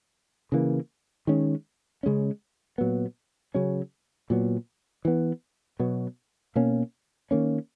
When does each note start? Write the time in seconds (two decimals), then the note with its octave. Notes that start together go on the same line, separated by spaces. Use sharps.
0.52 C#3 E3 A#3
1.27 D#3 G#3 C#4
2.03 C#3 G#3 C#4
2.78 A#2 F#3 B3
3.55 C#3 F#3 C#4
4.30 A#2 F#3 B3
5.05 E3 B3
5.80 B2 F#3 B3
6.56 B2 A#3 C#4
7.31 D#3 A#3 C#4